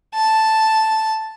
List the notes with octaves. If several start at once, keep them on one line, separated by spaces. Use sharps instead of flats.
A5